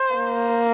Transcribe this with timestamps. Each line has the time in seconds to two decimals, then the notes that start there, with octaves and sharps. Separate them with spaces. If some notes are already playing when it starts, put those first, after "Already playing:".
Already playing: C5
0.16 A#3